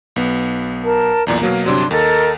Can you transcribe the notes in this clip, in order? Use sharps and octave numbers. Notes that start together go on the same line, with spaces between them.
B1 B3
A#4 A5
B1 E2 A#2 D5 A#5
B2 F#3 A#3 F5
G1 C3 F#3 D4 D5 C6
D#2 A4 A#4 D#5